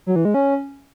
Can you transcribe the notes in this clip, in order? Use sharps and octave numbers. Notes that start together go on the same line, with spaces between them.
F#3
E3
G#3
C#4